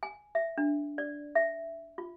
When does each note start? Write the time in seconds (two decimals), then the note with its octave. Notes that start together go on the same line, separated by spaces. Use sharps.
0.03 G#5
0.35 E5
0.58 D4
0.98 D5
1.35 E5
1.98 F4